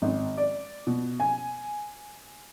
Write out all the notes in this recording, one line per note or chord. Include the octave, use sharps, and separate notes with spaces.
G#1
D5
B2
G#5